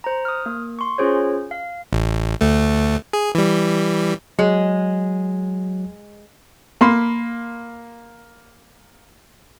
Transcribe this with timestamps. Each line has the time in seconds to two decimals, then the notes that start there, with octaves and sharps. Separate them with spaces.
0.04 C5 A#5
0.25 D#6 F6
0.46 A#3
0.79 C6 C#6
0.98 C#4 F4 G#4 C5 C#5
1.51 F5
1.93 A1
2.41 D2 A3
3.13 G#4
3.35 E3 G3
4.39 F#3 G#3
6.81 A#3 B5 C6